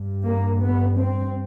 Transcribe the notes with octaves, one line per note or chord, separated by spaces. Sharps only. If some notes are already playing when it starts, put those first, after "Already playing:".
Already playing: G2
A#3
B3
C4